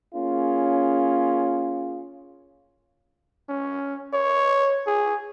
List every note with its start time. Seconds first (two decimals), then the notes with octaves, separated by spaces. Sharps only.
0.14 A#3 C#4 F4 G#4
3.49 C#4
4.13 C#5
4.87 G#4